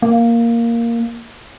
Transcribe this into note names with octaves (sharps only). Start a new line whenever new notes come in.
A#3